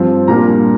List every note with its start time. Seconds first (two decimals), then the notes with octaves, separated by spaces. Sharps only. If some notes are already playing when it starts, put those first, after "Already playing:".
Already playing: G2 F3 C4
0.28 A#2 G3 A#3 D4 A#5